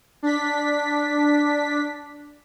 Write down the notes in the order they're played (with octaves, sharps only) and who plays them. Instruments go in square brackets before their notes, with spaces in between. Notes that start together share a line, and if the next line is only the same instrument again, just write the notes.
[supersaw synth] D4 B6